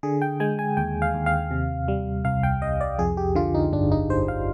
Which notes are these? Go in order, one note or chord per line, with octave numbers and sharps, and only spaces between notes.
D3 G#4
G5
G#3 G#5
G#5
D#2 G5
F5
D#2
F5
C3
G3
C2 F5
G5
C2 D#5
D5
F2 G#4
G4
D3 F4
D#4
G1 D4
D#4
G1 C5
F5